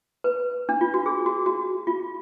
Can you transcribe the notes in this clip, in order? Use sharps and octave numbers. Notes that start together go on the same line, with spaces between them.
B4
D4
F4
F#4
G#4
F#4
F#4
F4